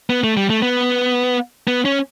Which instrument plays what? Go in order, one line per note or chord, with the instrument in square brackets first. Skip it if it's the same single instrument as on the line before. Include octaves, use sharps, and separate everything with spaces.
[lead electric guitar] B3
A3
G3
A3
B3
B3
C#4